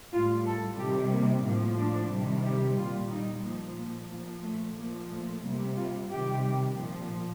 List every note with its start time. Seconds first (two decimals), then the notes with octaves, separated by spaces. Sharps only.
0.12 A2 G3 F4
0.46 A4
0.78 C3 D#3 G3 G4
1.12 A#3
1.45 A2 F3 A#3
1.78 D4
2.11 C3 D#3 G3
2.44 G4
2.78 A#2 G3 F4
3.11 D#4
3.44 A#2 F3 A#3
3.77 A#3
4.10 A#2 F3 A#3
4.44 A3
4.77 A#2 F3 A#3
5.10 A3
5.43 C3 G3 A#3
5.76 F4
6.10 C3 D#3 G3 G4
6.76 A#2 F3